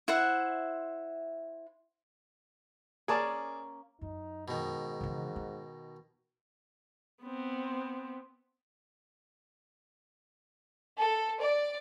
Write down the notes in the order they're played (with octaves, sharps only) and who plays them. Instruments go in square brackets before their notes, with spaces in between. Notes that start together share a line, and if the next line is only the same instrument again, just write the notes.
[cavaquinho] E4 C5 E5 F#5
[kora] A#3 C#4 [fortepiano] G#4 D5 A5
[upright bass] F#2 [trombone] D#4
[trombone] G#2 [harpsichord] B2 D#3
[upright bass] C#3 E3
D#4
[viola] B3 C4
[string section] A4
D5